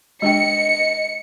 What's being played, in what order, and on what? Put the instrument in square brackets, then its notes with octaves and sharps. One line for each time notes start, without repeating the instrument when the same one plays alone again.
[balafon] G#3 D4 G5 [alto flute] D#5 [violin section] C#7